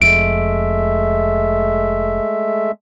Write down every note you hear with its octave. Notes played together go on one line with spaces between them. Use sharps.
F1 F2 G#3 A3 E5 D7